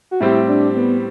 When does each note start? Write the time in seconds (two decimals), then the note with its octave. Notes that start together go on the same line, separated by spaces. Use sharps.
0.11 F#4
0.20 A2 G3 C4 E4 G4
0.48 D4
0.76 B3